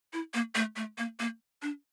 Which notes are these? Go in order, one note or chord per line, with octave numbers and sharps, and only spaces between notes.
E4
A#3
A3
A3
A#3
A#3
D4